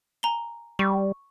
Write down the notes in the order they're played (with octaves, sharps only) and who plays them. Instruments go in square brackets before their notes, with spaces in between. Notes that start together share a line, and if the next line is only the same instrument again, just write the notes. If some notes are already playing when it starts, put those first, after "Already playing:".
[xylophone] G#5 A#5 G7
[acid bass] G3 [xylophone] C#6